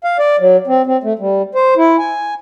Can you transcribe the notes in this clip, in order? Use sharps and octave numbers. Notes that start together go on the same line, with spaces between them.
F5
D5
F#3
C4
C4
A3
G3
C5
E4
G#5